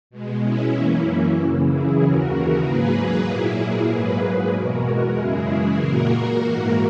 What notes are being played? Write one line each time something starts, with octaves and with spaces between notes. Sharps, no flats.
B2 G#3
C#4 E4
F#2 E3 A#3
F#2 C#3 E3
E4 G#4
D#2 C#3 E3 F#4 A#4
G#2 F#3 A#3 G#4 B4
A#2 F#3 A#3 E4 G#4
G#2 F#3 A#3 G#4 B4
G#4 B4
E2 B2 G#3 F#4 A#4
F#2 C#3 E3 G#3 E4 G#4
E4 G#4
A#2 A#3 F#4 A#4
G#2 E3 A#3